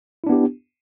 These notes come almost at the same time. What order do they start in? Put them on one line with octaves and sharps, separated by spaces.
E4 D4 B3 G4